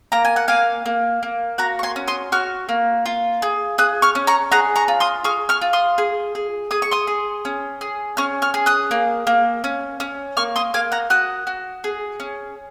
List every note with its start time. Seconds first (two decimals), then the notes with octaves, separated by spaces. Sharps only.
0.12 A#3 A#5
0.25 G#5
0.36 F#5
0.48 A#3 F5 G#5
0.86 A#3
1.23 A#3
1.58 F#4 F#5 A#5
1.79 C#6
1.83 G#5 C6
1.96 C#4
2.08 C6 D#6
2.32 F#4 C#6 F6
2.69 A#3
3.06 F4
3.42 G#4
3.78 G#4 D#6 F#6
4.02 C#6 F6
4.15 C#4
4.27 A#5 C#6
4.52 G#4 F#5 A#5
4.76 A#5 C#6
4.88 F4
5.00 C6 D#6
5.24 G#4 C#6 F6
5.49 C#6 F6
5.62 F4
5.73 C6 D#6
5.98 G#4
6.35 G#4
6.71 G#4 D#6
6.82 C#6
6.91 C6 D#6
7.07 G#4
7.45 C#4
7.81 G#4
8.17 C#4 C#6 F6
8.42 C#6 F6
8.54 G#4
8.66 D#6 F#6
8.91 A#3
9.27 A#3
9.64 C#4
10.00 C#4
10.37 A#3 C#6 F6
10.56 C6 D#6
10.74 A#3 F5 G#5
10.92 F#5 A#5
11.10 F#4 D#6 F#6
11.47 F#4
11.84 G#4
12.20 C#4